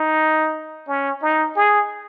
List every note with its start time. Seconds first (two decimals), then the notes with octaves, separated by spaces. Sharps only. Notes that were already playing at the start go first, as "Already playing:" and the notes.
Already playing: D#4
0.88 C#4
1.22 D#4
1.56 G#4